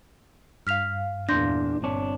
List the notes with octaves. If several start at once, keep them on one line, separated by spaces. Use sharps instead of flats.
G2 F5 F6 B6 F7
E2 A#2 D4 C6 G6 A#6
G1 C4 D4 C#5